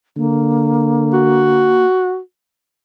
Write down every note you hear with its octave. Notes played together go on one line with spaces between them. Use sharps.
D3 A#3
F#4